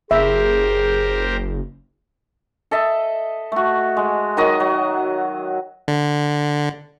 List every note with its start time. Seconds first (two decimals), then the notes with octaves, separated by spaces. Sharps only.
0.11 F#1 G4 G#4 A#4 C5 E5
2.71 A4 D#5 E5
3.52 A3 F#4
3.97 G#3
4.37 D#3 F#3 D#5
4.60 F#3
5.88 D3